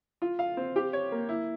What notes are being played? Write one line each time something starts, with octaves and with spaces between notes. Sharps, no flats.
F4
F5
C4
G4
C#5
A#3
E4